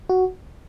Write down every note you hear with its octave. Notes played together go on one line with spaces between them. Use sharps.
F#4